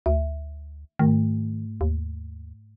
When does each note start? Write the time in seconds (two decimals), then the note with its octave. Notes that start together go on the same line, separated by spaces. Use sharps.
0.06 D2 E5
0.99 G#2 D#3 A3
1.81 D#2